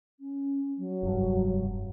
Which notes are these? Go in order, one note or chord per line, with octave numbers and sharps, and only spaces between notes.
C#4
F#3
F1 G2